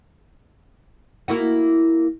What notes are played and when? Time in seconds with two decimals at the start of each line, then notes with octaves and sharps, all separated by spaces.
1.28 A#3 E4 F#4